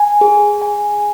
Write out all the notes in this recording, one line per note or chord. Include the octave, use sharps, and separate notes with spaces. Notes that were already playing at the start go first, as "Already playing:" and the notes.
Already playing: G#5
G#4
G#5